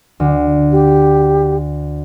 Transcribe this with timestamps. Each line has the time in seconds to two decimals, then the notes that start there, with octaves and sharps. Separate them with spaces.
0.20 D2
0.72 G4